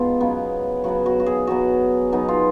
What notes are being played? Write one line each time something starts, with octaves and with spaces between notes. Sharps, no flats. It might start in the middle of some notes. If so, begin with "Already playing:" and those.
Already playing: B2 G#3 D#4 F4
C#3 F#3 B3
C#3 F#3 B3 F#4
F#4
F#4
G#4
B2 F#3 B3 F#4
B2 F#3 B3 D#4
F4